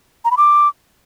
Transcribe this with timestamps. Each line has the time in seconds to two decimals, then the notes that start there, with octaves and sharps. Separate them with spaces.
0.25 A#5
0.31 B5
0.37 D6